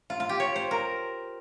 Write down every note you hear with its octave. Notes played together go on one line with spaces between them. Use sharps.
F4
F4
G4
C#5
C5
A#4